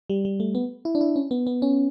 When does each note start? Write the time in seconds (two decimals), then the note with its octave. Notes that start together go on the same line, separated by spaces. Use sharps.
0.10 G3
0.25 G3
0.40 A3
0.55 B3
0.85 E4
0.95 D4
1.01 E4
1.16 C#4
1.31 B3
1.47 B3
1.62 C#4